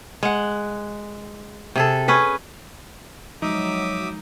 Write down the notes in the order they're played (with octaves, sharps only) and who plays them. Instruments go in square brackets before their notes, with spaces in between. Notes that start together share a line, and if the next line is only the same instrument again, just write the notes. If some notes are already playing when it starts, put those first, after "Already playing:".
[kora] G#3 F#5
C3 G#4 A4
C#4 G#4 B4
[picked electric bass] F3 G#3 [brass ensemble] F#3 [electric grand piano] D#4 [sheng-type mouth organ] E5 D6 D#6